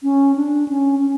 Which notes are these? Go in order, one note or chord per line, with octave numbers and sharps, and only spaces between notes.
C#4
D4
C#4
C#4